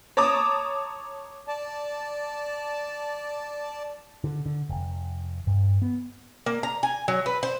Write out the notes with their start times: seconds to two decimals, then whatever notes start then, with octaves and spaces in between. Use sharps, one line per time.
0.17 C#5 A5 A#5 D6 D#6
1.48 D5 A5
4.24 D3
4.46 D3
4.69 F1
5.47 G2
5.82 B3
6.46 A#3
6.63 A#5
6.83 G#5
7.08 F#3
7.26 B4
7.43 C5